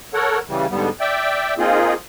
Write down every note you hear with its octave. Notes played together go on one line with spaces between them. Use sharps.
A4 A#4 C#5 F#5
C#3 E3 G3
G#2 D3 G3 B3
D5 E5 G5
A#3 C4 D#4 F4 G#4